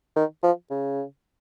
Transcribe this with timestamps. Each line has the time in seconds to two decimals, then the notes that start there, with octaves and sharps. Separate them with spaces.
0.16 D#3
0.43 F3
0.70 C#3